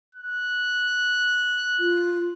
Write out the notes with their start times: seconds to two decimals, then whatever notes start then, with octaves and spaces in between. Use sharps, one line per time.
0.15 F#6
1.79 F4